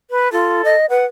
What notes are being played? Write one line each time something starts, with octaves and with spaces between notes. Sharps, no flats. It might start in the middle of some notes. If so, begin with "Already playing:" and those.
B4
F4 A4
D#5
B4 F#5